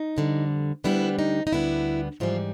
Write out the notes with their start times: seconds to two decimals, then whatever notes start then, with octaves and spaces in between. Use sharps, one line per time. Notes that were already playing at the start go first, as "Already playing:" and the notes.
Already playing: D#4
0.16 F2 D3 G3
0.84 D2 D3 G3 B3 D4 E4
1.19 D#4
1.47 D#4
1.53 D2 D3 G3 B3 D4 E4
2.20 G#2 E3 F3 G3 F4